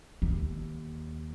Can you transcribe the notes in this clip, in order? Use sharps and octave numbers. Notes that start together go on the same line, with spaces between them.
D#2